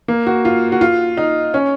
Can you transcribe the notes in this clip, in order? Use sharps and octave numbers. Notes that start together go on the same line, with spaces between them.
A#3
F#4
F4
F#4
F4
D#4
C#4